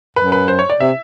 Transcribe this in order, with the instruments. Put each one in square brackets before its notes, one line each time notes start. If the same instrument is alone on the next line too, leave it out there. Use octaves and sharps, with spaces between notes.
[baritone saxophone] F#2 [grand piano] B4
[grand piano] B4
C5
C#5
D5
[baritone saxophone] C3 [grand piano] E5